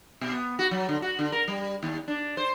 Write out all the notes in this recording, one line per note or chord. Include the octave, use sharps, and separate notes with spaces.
B2
B3
F#4
F#3
D3
F#4
D3
A#4
G3
D#2
D4
C5